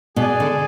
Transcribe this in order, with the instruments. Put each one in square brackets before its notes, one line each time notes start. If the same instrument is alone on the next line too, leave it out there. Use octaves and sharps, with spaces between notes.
[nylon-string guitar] B2 [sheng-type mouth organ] G#4 D5 G#5
[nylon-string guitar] D3